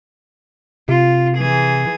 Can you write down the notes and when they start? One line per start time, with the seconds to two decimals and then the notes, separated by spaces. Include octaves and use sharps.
0.89 C3 F4
1.37 E3 G#4